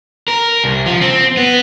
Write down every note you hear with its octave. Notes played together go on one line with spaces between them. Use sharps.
A#4
C2
F3
C4
B3